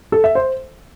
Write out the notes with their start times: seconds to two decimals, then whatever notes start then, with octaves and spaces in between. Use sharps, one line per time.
0.12 A4
0.24 E5
0.35 C5